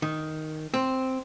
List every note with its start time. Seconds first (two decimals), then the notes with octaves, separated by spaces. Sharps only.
0.02 D#3
0.74 C4